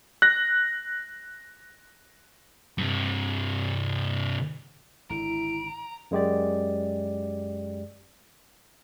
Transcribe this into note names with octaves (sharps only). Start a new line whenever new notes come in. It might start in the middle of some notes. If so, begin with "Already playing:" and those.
F#6 A#6
G2 C3
G#1 D3 E4 A#5 D7
F#2 G#3 G4 D5